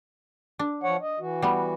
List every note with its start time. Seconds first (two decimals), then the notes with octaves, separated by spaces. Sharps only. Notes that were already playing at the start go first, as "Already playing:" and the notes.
0.59 D4
0.83 F3 C#5 F#5
1.01 D#5
1.19 E3 F#4
1.42 G3 B3